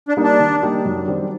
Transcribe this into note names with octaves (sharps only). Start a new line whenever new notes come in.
D4
G3 A#3 D#4 G4
D4
D#3
G3 A#3 D#4 G4
F#2
D#3 G3 C4 G4